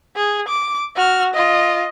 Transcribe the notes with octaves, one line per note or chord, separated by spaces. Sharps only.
G#4
D6
F#4 F6
F4 D#5